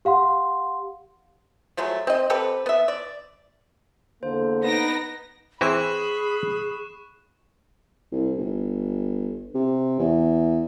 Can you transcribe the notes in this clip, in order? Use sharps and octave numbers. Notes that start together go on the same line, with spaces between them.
G4 F5 F#5 C6
F3 F#3 G#3 A3
C4 D#5
C4 G4 A4 B4
B3 E5
D5
E2 D3 A#3 C5
B3 D#4 B4 A#6 D7
E3 C4 E4 G#4 B5 C#6 F#6 E7
C2
G1
C3
E2